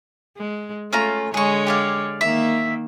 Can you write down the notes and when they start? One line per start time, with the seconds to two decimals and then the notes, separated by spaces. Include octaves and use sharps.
0.37 G#3
0.93 A3 C#4 F4 A#5
1.34 D3 G#3 G#4 C#5 C#6
1.67 G4 D5 F5
2.21 D#3 A#3 E5